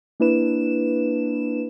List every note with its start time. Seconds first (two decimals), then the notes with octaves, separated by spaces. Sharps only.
0.20 A#3 D4 E4 B4 E7